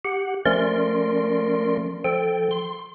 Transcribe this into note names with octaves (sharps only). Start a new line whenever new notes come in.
G4 F#5
F3 A3 C#4 A#4 D5 C6
F3 A4 G5
C6